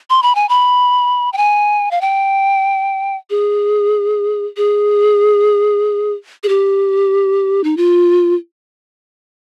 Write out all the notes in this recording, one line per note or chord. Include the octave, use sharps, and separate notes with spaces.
C6
B5
G#5
B5
G5
G#5
F5
G5
G#4
G#4
G#4
G4
D#4
F4